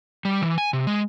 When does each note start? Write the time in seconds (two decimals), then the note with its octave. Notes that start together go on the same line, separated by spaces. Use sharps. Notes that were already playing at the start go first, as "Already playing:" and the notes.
0.25 G3
0.42 E3
0.58 G#5
0.73 C3
0.87 G#3